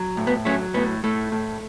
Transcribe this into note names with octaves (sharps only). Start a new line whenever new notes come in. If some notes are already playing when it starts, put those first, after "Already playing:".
Already playing: F#3
A2
B3
F#3 A3 C#4
A2 B3
A2 A3
A2